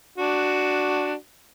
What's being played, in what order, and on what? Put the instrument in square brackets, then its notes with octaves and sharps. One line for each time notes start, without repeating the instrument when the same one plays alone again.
[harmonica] D4 F#4